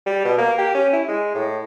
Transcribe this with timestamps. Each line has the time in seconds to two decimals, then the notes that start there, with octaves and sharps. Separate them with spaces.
0.06 G3
0.24 B2
0.38 A#3
0.58 G4
0.74 C#4
0.93 E4
1.08 G#3
1.35 A2